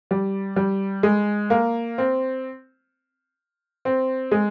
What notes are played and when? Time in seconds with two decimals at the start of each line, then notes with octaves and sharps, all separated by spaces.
0.11 G3
0.56 G3
1.03 G#3
1.50 A#3
1.98 C4
3.85 C4
4.32 G#3